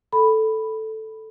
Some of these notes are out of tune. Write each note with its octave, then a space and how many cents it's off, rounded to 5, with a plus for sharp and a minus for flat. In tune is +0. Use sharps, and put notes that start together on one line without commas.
A4 +0 B5 +0